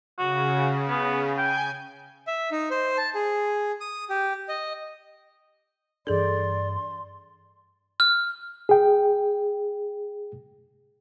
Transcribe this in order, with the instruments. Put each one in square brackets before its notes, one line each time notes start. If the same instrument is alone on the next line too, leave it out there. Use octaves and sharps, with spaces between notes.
[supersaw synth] C#3 [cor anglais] F#4
[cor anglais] B3
[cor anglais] G5 [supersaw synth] G#5 G6
[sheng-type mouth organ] E5
D#4
C5
A5
G#4
D#6
G4
D#5
[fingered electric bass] G2 D4 [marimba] E3 G#4 A4 [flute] D5 [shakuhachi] C6
[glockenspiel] F6
[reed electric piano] G#4 G5